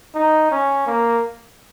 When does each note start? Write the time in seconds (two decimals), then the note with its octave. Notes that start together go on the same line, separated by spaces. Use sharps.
0.15 D#4
0.51 C#4
0.86 A#3